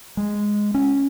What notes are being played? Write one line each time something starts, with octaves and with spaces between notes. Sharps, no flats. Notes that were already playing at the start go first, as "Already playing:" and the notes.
G#3
C#4